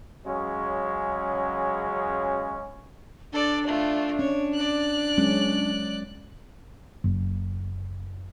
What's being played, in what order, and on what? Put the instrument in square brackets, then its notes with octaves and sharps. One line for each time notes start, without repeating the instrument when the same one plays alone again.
[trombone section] C#3 F#3 G#3 C#4
[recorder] D4 [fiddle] A4 D5
[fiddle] A3 F4
[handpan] C#4 [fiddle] C#5
[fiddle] D5 F#6
[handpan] F#3 G#3 C#4
[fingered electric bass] F#1